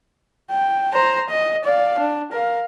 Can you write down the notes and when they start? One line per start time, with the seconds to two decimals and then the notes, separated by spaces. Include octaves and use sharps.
0.51 G5
0.93 C5 A#5
1.29 D#5
1.65 D5 F5
1.99 D4
2.32 A#4 F5